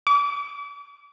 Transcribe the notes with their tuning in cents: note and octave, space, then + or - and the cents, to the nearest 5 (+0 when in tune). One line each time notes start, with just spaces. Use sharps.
D6 -40